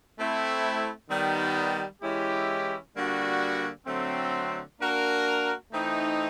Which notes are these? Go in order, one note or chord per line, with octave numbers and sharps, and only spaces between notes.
A3 C4 E4
D#3 G3 B3
E3 G#3 C#4 E4 G4
D3 G3 A#3 D4 F#4
D3 F#3 A3 C4
A#3 D4 F#4 A#4
E3 A3 C4 D#4